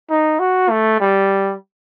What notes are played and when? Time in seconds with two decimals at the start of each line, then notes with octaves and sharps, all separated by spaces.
0.10 D#4
0.40 F#4
0.70 A3
1.00 G3